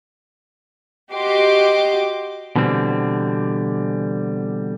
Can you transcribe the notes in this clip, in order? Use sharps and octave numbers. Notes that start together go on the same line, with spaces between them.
F#4 G4 D#5 C6 D6
B2 D3 E3 G3 C4